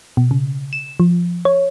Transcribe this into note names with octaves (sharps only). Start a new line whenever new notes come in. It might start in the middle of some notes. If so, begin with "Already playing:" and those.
B2
C#3
E7
F3
C#5